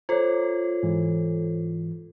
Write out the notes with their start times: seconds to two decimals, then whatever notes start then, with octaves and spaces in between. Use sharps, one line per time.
0.09 F4 A4 C5 C#5
0.83 G#2 E3